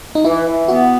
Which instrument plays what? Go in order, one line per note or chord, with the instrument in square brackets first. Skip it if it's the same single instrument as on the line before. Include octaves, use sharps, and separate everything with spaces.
[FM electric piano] D#4
[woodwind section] E3 [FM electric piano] E4
[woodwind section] E3
[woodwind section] B3 [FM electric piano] F#4